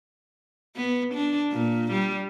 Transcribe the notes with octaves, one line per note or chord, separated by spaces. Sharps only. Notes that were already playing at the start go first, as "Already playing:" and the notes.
B3
D4
A#2
G3